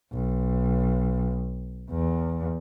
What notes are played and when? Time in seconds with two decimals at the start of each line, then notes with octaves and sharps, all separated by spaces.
0.13 B1
1.90 E2